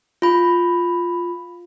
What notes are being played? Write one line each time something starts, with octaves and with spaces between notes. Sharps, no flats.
F4 B5